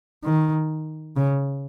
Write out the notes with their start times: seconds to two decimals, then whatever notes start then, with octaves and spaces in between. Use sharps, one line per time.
0.24 D#3
1.17 C#3